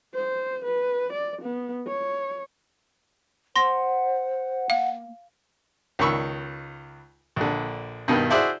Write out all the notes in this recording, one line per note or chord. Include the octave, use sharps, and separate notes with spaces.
C5
B4
D5
B3
C#5
C5 F#5 C6 A#6
A#3 F5
C#2 D#3 B5 C#6 E6
A#1 D3
G2 B2 D#3
E4 F#4 G#4 C5 D5 E5